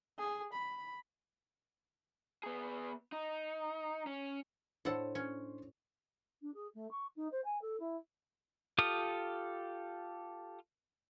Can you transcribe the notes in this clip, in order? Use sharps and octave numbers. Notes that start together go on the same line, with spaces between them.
G#4
B5
B3 G#4
D#4
C#4
A2 D4 A4 C5 C#5 F#5
C#4
D4
G#4
A3
C#6
D#4
C5
G#5
A4
E4
F4 G4 A4 D#6